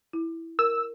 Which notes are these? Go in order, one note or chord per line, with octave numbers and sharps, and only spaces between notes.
E4
A#4 E6